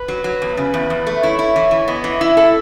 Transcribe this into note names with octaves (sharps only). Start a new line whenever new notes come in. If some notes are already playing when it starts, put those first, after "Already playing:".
Already playing: B4
F#3
F#3
E2
C#3
E2
E2
A3
E4 C#5
E4
E3
E3
B3 D#5
E3
E4 E5
A4